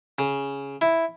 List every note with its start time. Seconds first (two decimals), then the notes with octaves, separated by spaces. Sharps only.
0.19 C#3
0.81 E4